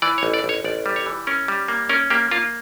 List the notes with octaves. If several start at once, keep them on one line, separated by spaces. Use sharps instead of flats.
E3 D5
C#5
A1
D5
A1 C#5
A1 D5
G3
C#5
E3
C#4 A#4
G3
A#3
C#4 A#4
A#3 G4
A#3 F4